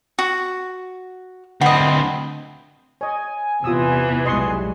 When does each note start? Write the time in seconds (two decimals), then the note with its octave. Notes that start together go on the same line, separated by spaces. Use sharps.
0.19 F#4
1.61 D2 C4 D#5 F#5 B5
3.01 C#5 D#5 G#5
3.64 E2 C3 E3 F4 D#6 E6
4.25 B1 G3 G#3 D#5 C6 C#6